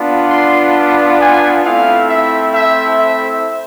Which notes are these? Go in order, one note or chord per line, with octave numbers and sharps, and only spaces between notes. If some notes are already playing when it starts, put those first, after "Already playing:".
Already playing: B3 D4 F4
C6
G#5
A3 C4 E4 F5
E5
E5
E5